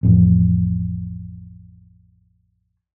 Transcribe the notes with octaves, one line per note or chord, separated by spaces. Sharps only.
A1 F2